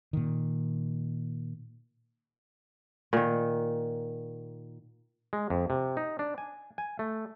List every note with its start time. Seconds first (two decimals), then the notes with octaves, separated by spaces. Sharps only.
0.13 A#2 D#3
3.13 A#2 D#3
5.33 G#3
5.50 F2
5.70 C3
5.97 D#4
6.19 D4
6.38 G#5
6.78 G#5
6.99 A3